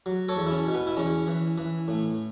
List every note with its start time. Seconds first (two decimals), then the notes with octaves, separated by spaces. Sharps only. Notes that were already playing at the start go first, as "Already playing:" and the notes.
0.06 F#3
0.28 A4 C#5
0.36 E2
0.47 E4
0.51 C#4
0.67 B2
0.74 B3
0.87 E4
0.97 E2 C#4
1.27 E3
1.58 E3
1.88 A2